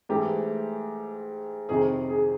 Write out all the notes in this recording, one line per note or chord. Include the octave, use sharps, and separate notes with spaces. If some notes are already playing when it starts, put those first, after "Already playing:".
G#2 E3 A3 G4
F2 C3 D#3 G#4
G#4